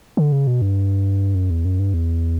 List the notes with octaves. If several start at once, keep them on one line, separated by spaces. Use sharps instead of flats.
D3
C#3
B2
G2
F#2
E2
F#2
G2
E2